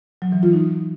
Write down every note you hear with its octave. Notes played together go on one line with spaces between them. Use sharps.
F#3
E3
F4
D#4